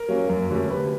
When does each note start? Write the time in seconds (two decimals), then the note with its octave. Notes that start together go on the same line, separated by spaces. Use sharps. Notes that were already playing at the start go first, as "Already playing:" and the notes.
Already playing: A#4
0.09 F#3 A#3 C#4
0.29 F#2
0.51 D3 F#3 A3 C#4
0.70 C3 B4